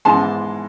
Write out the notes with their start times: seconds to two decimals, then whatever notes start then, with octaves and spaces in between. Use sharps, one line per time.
0.05 G#2 E3 G#3 B3 A5 C6